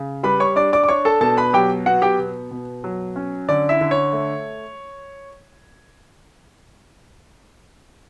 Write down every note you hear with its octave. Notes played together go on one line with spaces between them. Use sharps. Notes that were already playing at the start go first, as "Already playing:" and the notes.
Already playing: C#3
G3 B4 B5
C#5 C#6
D4 D5 D6
D5 D6
D6
D4 C#5 C#6
A4 A5
B2 A4 A5
B4 B5
F#3 G4 G5
B3 F#4 F#5
G4 G5
B2
B2
F#3
C#4
D3 D5
E4 E5
D3
C#5
A3